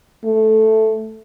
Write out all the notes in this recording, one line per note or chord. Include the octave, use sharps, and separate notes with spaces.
A3